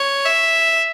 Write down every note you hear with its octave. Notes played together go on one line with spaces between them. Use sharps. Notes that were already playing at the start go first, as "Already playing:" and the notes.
Already playing: C#5
E5